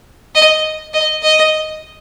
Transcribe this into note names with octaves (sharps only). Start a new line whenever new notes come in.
D#5
D#5
D#5